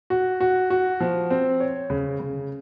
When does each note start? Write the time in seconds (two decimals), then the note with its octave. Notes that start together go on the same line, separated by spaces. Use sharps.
0.10 F#4
0.41 F#4
0.70 F#4
1.00 F3
1.30 C4
1.60 C#5
1.90 C#3
2.20 C#3